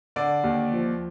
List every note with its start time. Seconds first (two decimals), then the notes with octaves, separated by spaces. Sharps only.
0.16 D3 D5
0.44 D#2
0.72 F3